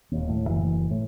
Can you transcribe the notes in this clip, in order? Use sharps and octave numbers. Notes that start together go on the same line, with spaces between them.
D#1 D#2
A2
F#1 E3
A2